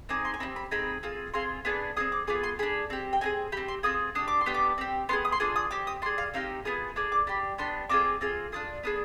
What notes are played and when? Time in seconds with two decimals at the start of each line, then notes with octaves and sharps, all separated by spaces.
0.09 C4 D#4 G#4 D6
0.25 C6
0.34 G#5
0.40 C4 D#4 G4 B5
0.56 B5
0.71 C4 D#4 G#4 B5
1.03 C4 F4 G#4
1.34 C4 F4 G#4 C6
1.65 B3 D4 G#4 D6
1.97 C4 F4 G#4 D#6
2.12 D6
2.28 B3 F4 G#4 D6
2.43 C6
2.59 D4 G#4 B5
2.90 C4 G4
3.13 G5
3.21 C4 D#4 G#4 G#5
3.52 G4 B5
3.57 C4
3.68 C6
3.83 C4 F4 G#4 D#6
4.15 D4 G4 D#6
4.28 D6
4.41 C6
4.46 B3 D4 G4
4.54 D6
4.78 C4 G4
5.09 B3 D4 G#4 C6
5.25 D#6
5.32 C6
5.40 D4 F4 G#4 D6
5.56 D#6
5.71 C4 G4 D6
5.87 D#6
6.02 D4 C6
6.06 G#4
6.18 F5
6.34 C4 D#4 G4 F5
6.65 B3 F4 G#4 D#6
6.96 D4 G#4 D6
7.12 D6
7.27 D4 G4 B5
7.58 B3 D4 G4 C6
7.89 C4 F4 G#4 D6
8.21 C4 F4 G#4
8.52 D4 F4 G#4 D#6
8.83 B3 D4 G#4 D#6